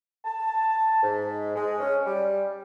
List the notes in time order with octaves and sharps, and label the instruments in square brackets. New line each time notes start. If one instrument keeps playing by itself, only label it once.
[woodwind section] A5
G#2
G#3
C#4
G3